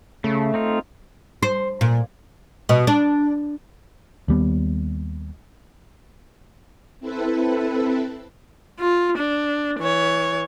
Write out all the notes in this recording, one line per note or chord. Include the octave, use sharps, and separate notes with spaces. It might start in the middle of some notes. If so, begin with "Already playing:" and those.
C#3 A3
C4 D#4 F4
C5
A#2
B2
D4
D#2 G3 B3
C4 E4 A4 B4
F4
D4
E3 C#5